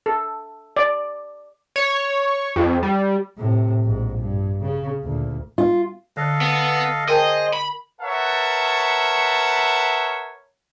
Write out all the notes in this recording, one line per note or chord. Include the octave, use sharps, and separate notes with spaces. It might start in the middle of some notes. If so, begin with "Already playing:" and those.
A4
D5
C#5
F2
G3
A2 C3
A#1 G#2
G2
C#3
D2 A#2
F4
D3 A4 D#5 F5 F#6
B3
G#4 A#4 C5 D#5 G5 A5
B5
A#4 B4 C#5 E5 F#5 A5